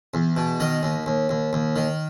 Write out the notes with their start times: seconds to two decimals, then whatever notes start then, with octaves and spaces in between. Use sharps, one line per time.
0.14 E2
0.37 B2
0.60 D#3 D#5
0.83 D#2
1.06 D#2
1.29 D#2
1.53 D#2
1.76 D#3